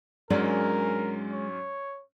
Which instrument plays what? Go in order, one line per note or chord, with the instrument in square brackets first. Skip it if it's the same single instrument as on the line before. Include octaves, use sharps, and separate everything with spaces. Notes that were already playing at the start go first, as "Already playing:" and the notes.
[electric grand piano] G#2 F#3 C#4 [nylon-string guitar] G#3 D4 D5 [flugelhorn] A#4
[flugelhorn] C#5